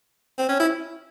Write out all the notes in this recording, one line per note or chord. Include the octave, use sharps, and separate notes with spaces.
C4
C#4
E4